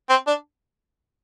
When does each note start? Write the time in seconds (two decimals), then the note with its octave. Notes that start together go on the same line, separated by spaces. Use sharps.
0.09 C4
0.27 D4